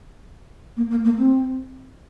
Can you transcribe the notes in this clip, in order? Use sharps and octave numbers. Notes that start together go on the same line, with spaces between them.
A#3
A#3
A#3
C4